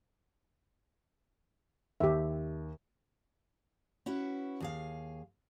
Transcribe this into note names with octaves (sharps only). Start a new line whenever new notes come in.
D#2 G4 E5
C#4 E4 F#4 B4
D#2 G#4 F5